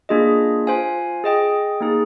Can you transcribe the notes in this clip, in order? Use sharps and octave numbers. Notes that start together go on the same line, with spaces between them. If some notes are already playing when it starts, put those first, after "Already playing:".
A#3 D4 F4 G#4 D#5
F4 C5 F5 G#5
G#4 D#5 G5
A#3 D#4 G#4